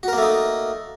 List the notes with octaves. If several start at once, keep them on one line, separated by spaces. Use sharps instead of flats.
A3 A#3 D#4 F#4 A#4